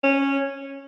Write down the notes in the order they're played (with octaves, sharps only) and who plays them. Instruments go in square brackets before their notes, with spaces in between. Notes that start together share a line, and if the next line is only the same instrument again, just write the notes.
[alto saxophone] C#4